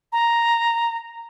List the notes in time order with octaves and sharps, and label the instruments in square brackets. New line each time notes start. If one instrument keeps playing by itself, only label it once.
[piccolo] A#5